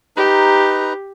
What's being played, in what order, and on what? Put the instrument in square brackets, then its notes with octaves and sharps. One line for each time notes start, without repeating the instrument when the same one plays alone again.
[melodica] D#4 B4 A#5 [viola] G4